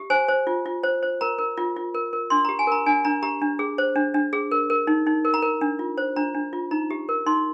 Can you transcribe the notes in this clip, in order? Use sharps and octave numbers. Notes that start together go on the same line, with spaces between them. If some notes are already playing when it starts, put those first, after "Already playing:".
Already playing: G4
C5 G#5
C5
F4
F4
C5
C5
A#4 A#5
A#4
F4
F4
A#4
A#4
D4 C6
G4 A#5
G#5
A#4 A#5
D4 G#5
D4 A#5
G4 A#5
D4
G#4
C5
D4
D4
G#4
A#4
A#4
D#4
D#4
A#4
A#5
A#4
D4
F4
C5
D4 A#5
D4
F4
D#4 A#5
G4
A#4
D#4 C6